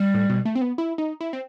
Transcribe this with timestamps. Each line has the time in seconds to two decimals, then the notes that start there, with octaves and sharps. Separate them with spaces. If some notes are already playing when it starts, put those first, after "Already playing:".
Already playing: G3
0.14 A2
0.29 B2
0.45 A3
0.55 C4
0.61 B3
0.78 E4
0.98 D#4
1.21 E4
1.33 C4